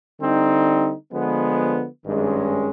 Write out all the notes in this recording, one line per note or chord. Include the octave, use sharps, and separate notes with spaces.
D3 G3 C4 D#4
D3 F3 G#3 B3
G#1 G2 D#3 G#3 C#4